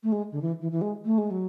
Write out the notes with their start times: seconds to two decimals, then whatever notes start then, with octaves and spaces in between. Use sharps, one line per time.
0.03 A3
0.12 G#3
0.32 D3
0.42 E3
0.61 E3
0.72 E3
0.82 G#3
1.05 A3
1.18 G#3
1.31 F#3